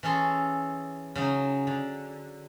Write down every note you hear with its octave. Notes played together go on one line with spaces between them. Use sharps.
E3 C#4 G#4 A4 C6
C#3 F#3 D#4
D3